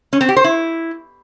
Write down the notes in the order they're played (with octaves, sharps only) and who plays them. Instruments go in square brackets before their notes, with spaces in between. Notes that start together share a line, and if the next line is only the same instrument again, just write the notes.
[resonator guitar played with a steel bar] C#4
C4
G4
C5
E4